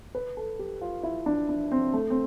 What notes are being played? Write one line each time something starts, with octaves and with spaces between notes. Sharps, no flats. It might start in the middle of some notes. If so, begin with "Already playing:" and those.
B4
A4
G4
F4
E4
D4
D4
C4
A3
C4